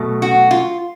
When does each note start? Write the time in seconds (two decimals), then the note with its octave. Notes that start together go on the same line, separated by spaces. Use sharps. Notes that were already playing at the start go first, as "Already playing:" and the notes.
Already playing: B2 F#3 A3
0.22 F#4
0.51 F4